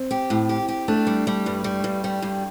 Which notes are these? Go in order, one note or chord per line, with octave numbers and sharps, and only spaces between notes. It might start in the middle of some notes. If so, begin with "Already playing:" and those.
Already playing: C4
G4
A2
G4
G4
A3 D4
G3
G3
G2
G3
G2
G3
G2